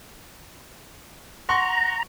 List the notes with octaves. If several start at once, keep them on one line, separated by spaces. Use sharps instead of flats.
F#5 A#5 C6 C#6